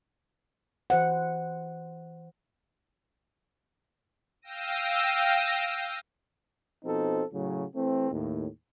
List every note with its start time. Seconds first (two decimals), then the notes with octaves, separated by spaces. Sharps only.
0.90 E3 C5 F#5
4.42 F5 G5 E6 A#6 D#7
6.85 B2 F3 C4 D#4 A4
7.33 A2 C#3 F#3
7.75 E3 A3 C4
8.12 D#2 A2